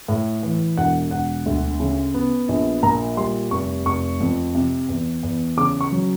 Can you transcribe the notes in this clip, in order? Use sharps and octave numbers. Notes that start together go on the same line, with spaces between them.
A2
E3
E1 F#5
E1 F#5
D2
C#3
B3
A#1
A#2 A#5
G3 C6
F1 C#6
F1 C#6
F2
C3
E2
E2
C#3 D6
C#6
F#3